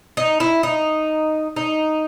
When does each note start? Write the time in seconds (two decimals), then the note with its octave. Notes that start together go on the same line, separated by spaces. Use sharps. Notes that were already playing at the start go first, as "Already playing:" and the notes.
0.17 D#4
0.40 E4
0.63 D#4
1.56 D#4